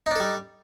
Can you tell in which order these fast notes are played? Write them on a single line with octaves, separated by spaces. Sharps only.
D#4 D4 A4 G3